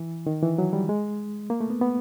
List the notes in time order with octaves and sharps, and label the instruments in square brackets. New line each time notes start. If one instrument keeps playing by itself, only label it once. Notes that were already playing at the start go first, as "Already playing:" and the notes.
Already playing: [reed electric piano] E3
D#3
E3
F#3
G3
G#3
A#3
A3
B3
B3